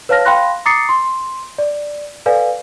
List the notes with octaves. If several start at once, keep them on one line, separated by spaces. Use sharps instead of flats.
B4 C#5 F5 A5 F6 A#6
F5 G5 B5 C6 F#6 A#6
A#5 D6 D#6 A6 C7 C#7
C6
D5
A4 B4 D5 F5 G#5